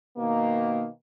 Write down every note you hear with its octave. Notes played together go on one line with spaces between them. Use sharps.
B2 D#3 A#3